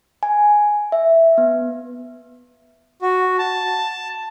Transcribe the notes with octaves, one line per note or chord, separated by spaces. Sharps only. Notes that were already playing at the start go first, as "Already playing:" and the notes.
G#5
E5
B3
F#4
A5